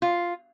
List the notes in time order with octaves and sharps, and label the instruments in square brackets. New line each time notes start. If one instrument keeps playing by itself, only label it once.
[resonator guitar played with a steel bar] F4